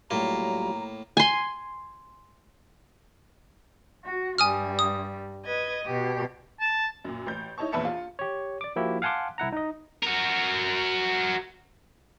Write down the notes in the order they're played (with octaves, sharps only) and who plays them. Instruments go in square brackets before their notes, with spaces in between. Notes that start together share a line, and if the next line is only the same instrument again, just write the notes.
[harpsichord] A2 A#3 [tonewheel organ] F#3 G3 F4 [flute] A#5
[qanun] G#5 C6
[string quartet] F#4
[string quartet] G2 G3 [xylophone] G#5 D#6 F6
[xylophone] D#6
[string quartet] B4 D#5 G#6
B2 G4
[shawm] A5
[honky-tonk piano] F#2 A#2
A1 G6
D#4 E4 C#5 A5 C#6
A#1 E2 B4 E5 A5 C#7
F4
[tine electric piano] G4 C#5
D5 D6
F3 A#3 E4 F#4 G4
F5 F#5 G#5 A5 C6 D6
C2 E4 F#5 A#5
D#4 D#5
[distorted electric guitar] F#4 A#4